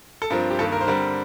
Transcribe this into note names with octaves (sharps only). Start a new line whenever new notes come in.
A4
G2 F3 C4 A#4
G4
G2 D#3 A#3 A4
A#4
C5
D3 G3 C4 A#4